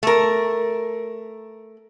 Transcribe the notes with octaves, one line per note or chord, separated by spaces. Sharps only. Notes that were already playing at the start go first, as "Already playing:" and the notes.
A3 A#4